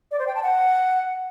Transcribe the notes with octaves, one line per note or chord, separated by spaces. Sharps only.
D5
C5
G5
A5
F#5